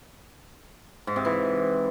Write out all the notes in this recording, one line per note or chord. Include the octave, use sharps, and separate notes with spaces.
G#2
C3
E3